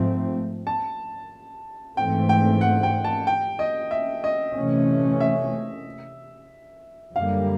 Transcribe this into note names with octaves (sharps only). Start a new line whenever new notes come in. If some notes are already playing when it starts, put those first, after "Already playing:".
Already playing: G#2 F3 A3 C4
A5
G#2 E3 A3 C4 G5
G5
F#5
G5
A5
G5
D#5
E5
D#5
C3 E3 A3 C#4
E5
F#2 D3 G3 A#3 F5